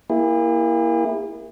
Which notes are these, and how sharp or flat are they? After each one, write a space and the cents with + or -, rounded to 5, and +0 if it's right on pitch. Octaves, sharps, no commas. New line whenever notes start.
A#3 +15 E4 +0 G#4 -45